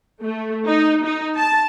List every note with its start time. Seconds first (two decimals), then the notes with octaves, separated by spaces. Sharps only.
0.21 A3
0.67 D#4
1.04 D#4
1.37 A5